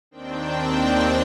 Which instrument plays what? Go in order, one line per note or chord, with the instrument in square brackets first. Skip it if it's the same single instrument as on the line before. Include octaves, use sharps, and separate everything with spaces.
[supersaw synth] D#2 D#3 C4 D4 G5